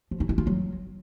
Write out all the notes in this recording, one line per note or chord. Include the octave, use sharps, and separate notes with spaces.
F3
D#4
E4
F4
F#3